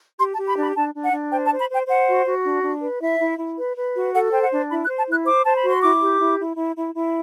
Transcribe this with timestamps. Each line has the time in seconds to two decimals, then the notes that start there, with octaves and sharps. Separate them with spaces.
0.18 G4 C6
0.32 A5
0.37 G4
0.47 B5
0.57 D4
0.62 B5
0.76 D4 A5
0.94 D4
1.03 F#5
1.13 D4
1.31 C5 G5
1.46 A5
1.51 C5
1.60 B5
1.69 C5 G5
1.88 C5 F#5
2.07 F#4
2.26 F#4
2.44 D4
2.63 D4
2.82 B4
3.00 E4 E5
3.19 E4
3.38 E4
3.58 B4
3.76 B4
3.95 F#4
4.13 A4 F#5
4.32 C5 G5
4.42 F#5
4.51 D4
4.69 E4 B5
4.84 F#6
4.89 C5
4.98 A5
5.07 E4 F#6
5.27 C5 D6
5.44 C5 A5
5.57 B5
5.63 F#4
5.69 C6
5.82 E4 D6
6.02 G4
6.20 E4
6.39 E4
6.58 E4
6.76 E4
6.95 E4